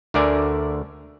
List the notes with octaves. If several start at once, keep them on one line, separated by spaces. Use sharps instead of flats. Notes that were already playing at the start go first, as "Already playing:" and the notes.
D2 D3 A3 A#4 D5 G#5